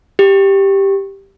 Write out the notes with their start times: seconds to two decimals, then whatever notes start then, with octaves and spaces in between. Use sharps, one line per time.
0.19 G4